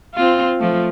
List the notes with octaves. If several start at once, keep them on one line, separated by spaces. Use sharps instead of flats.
C4 F4
F3 A3